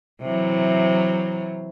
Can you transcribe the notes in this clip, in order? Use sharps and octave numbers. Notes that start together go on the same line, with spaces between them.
C3 E3 F#3